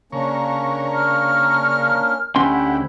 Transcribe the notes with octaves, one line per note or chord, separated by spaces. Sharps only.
C#3 A#3 C#4 D4 A#5 C#6
F6
D2 C#4 E4 G4 F#5 G5 C6